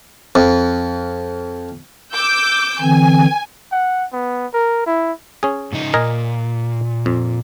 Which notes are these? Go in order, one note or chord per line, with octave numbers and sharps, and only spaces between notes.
F2
D6 E6 G6
D3 E3 C4 G#5
F#5
B3
A#4
E4
C#4 G#4
G#2 C#3 D#4
A#2 A#4 D#5 G#5
F2